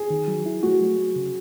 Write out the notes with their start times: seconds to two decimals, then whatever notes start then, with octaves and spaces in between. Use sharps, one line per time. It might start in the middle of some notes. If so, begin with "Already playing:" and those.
Already playing: G#4
0.10 D#3
0.28 F#3
0.46 E4
0.63 A3 F#4
0.81 F#3
0.99 F#3
1.16 C#3